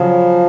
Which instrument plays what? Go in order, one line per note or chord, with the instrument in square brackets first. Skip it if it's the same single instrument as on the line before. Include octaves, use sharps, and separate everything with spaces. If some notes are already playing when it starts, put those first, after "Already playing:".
Already playing: [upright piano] C#3 F#3 [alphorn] F3